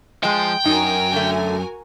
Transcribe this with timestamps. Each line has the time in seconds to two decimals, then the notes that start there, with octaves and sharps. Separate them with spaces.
0.23 F3 G#3 D#5 G5
0.65 F#2 D#4 F#4 A#4 G#5
1.12 D3 A3